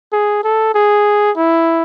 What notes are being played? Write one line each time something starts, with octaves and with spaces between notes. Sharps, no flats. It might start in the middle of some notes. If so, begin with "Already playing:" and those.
G#4
A4
G#4
E4